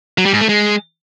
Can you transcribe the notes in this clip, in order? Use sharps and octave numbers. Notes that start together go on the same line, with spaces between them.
F#3
G3
G#2
A3
G#3